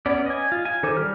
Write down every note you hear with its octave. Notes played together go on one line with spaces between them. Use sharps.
B3 C#4 D5
D#5 G#5
F4
G#5
D#3 A4 C5 D6
G3 G4 F6